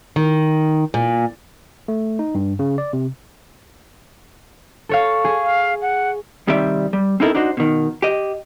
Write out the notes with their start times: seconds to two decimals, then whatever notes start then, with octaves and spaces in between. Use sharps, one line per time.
0.16 D#3
0.94 A#2
1.88 A3
2.19 D#4
2.35 G2
2.59 C#3
2.78 D5
2.93 C3
4.89 A4 C#5 F5
5.25 G#4
5.44 F5
5.82 F#5
6.47 C2 D#3 G3 C4 D5 E5
6.93 G3
7.20 C4 C#4 D#4 E4 A4 A#4
7.35 D4 D#4 F#4 C5
7.57 B2 D#3
8.02 G4 D#5